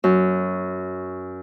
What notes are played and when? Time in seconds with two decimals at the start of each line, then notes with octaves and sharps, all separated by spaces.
0.04 F#2